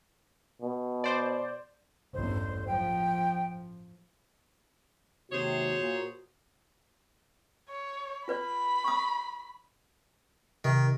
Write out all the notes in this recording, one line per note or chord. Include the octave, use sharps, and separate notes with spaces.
B2
C5 D5
A1 E2 G2 C5
F3 G5
D#2 G#2 C3 F#4 G#4 C5 C#5
A#2
C#5
F4 B4 D5 B5
C#6 D#6
C3 D#3